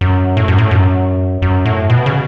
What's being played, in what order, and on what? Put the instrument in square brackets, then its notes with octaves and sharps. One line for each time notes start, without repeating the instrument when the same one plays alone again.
[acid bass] F#2
A2
F#2
A2
F#2
F#2
A2
B2
C#3